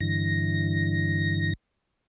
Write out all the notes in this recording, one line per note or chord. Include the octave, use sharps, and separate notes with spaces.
G2 D3 E3 A#6